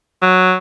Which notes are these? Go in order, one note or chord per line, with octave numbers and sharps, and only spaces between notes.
F#3